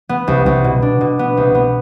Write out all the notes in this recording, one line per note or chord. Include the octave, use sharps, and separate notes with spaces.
B3
C2
C2
B2
D4
B2
B3
C2
B3